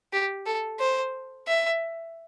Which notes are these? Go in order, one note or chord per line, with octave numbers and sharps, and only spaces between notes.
G4
A4
C5
E5